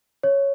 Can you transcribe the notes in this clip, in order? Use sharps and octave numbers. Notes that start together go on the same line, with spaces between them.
C#5